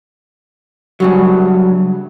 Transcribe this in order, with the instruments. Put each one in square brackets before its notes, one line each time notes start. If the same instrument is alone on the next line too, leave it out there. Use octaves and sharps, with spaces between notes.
[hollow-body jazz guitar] G2 C#3 F#3